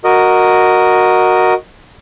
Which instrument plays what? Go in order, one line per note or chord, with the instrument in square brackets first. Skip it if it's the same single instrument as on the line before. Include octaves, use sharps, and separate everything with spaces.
[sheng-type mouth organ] F#4 A#4 D#5